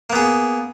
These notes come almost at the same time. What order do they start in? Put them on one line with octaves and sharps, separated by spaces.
A#3 B3 G#4